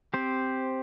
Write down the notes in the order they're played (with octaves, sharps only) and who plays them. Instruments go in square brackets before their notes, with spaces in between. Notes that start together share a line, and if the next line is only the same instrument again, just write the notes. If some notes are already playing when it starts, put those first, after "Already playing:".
[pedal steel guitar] C4 G4 C5